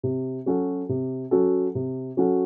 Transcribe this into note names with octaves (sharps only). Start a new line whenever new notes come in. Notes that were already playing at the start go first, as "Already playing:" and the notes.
C3
F#3 C#4 F#4 A4
C3
F#3 C#4 F#4 A4
C3
F#3 C#4 F#4 A4